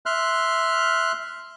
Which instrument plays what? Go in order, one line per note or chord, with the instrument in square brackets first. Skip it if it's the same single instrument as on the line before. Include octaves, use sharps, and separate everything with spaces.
[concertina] E5 C6 F6 F#6